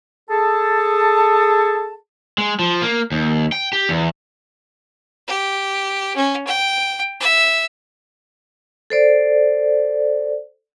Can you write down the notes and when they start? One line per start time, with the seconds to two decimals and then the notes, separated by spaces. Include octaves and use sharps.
0.30 G#4 A4 A5
2.38 G#3
2.59 F3
2.82 A#3
3.12 D#2
3.52 G5
3.73 G4
3.89 E2
5.28 G4
6.16 C#4
6.47 G5
7.21 E5
8.90 A4 C5 D5